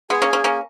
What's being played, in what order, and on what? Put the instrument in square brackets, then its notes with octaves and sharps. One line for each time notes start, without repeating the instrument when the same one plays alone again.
[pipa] G#3 B3 [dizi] G#4
[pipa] A#3 C#4
A#3 C#4
A#3 C#4